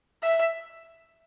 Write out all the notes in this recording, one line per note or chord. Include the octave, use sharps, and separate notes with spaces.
E5